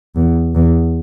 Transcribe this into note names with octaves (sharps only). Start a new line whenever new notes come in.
E2
E2